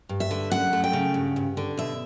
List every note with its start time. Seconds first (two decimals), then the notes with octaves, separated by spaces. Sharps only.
0.09 G2
0.20 E5
0.31 D3
0.52 F#2 F#5
0.73 A3
0.84 G5
0.93 C#3
1.14 G2
1.36 G2
1.57 D3
1.78 B2 E5